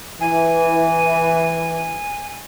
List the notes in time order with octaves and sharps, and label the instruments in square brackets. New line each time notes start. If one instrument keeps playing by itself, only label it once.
[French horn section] E3 [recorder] G#5